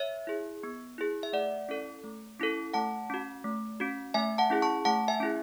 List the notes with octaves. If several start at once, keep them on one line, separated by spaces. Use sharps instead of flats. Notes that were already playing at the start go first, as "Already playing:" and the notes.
Already playing: C#5 E5
E4 G#4
B3
E4 G#4
E5
A3 D5 F#5
C#4 E4 A4
A3
C#4 E4 A4
A3 F#5 A5
C#4 F#4
A3
C#4 F#4
A3 E5 G#5
F#5 A5
C#4 E4 G#4
A5 C#6
A3 F#5 A5
E5 G#5
C#4 E4 G#4